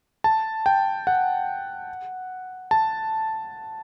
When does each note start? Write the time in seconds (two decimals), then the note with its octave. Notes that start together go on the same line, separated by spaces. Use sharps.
0.24 A5
0.66 G5
1.07 F#5
2.71 A5